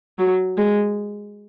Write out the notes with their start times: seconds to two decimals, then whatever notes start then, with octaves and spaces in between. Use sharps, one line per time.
0.18 F#3
0.58 G#3